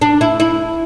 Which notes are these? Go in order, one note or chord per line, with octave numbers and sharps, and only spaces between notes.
D4
E4
E4